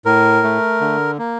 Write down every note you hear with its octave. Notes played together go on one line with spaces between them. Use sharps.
A2 A#4
A3
D3
A#3